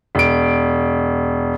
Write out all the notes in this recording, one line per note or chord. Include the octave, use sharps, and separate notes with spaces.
E1 D7